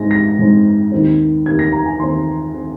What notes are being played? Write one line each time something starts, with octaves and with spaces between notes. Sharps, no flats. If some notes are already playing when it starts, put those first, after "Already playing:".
Already playing: G#2 G#3 C4 A#6
A#6
G#2 G#3 C4
D#2 D#3 C4
D#2 D#3 C4 G#6
A#6
A#5
G#5
D#2 D#3 C4 C6
D#3 C4